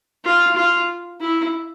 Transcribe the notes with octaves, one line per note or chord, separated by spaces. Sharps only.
F4
F4
E4